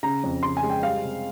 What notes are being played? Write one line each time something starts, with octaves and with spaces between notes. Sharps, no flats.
C#3 A#5
F2
C#3 C6
G#5
G#3
G5
G3 F5
C3